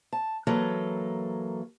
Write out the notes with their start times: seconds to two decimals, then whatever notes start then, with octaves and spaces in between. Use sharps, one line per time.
0.13 A5
0.47 E3 F#3 A#3 A4